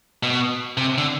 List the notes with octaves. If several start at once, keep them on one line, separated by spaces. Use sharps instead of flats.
B2
C3
D3